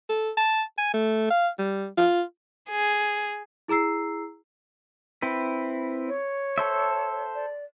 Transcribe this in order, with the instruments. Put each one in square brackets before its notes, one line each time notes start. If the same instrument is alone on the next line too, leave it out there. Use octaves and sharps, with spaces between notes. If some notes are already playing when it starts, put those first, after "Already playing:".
[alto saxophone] A4
A5
G#5
A3
F5
G3
F4
[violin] G#4
[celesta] E4 G#4 A#5 E6 C7
[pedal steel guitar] C4 E4 B4
[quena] C#5
[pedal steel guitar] A4 C5 E5
[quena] D5